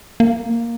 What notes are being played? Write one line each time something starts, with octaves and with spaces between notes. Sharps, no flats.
A#3